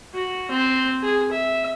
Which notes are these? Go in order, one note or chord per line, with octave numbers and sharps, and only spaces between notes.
F#4
C4
G#4
E5